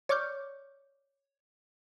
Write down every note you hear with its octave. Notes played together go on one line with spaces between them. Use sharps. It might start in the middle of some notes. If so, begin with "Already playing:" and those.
C#5 D5 C#6 D6 F6 G6